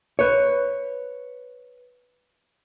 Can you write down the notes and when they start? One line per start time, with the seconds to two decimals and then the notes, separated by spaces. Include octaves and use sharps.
0.19 B4 C#5